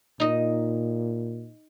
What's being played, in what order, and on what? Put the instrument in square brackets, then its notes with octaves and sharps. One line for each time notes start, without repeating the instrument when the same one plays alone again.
[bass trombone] A#2 [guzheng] D#4 D#5